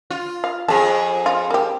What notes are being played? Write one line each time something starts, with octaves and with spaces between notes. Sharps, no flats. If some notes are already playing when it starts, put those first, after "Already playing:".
F4
F5
F2 G#4 A5
F4
A#3 G4